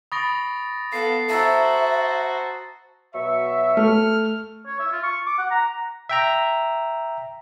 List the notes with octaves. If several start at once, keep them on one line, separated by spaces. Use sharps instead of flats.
B5 C#6 D#6 A6 A#6 D7
B3 A4 F5 C7
F#4 C5 E5 A5 A#5 E6 A6 A#6
B2 F#3 E5 C#6
A3 F6
C#5
E5
F4
C#6
D6
F#5
A#5
E5 G5 A#5